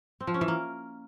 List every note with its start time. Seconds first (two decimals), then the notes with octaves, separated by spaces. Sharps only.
0.21 C4
0.27 F3
0.34 C#4
0.41 E3
0.48 A#3